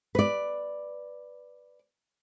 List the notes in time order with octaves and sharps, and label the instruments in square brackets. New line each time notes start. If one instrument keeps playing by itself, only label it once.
[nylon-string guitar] B4 D5